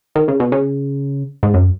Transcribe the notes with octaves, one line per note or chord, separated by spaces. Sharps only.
D#3
C#3
B2
C#3
G#2
F#2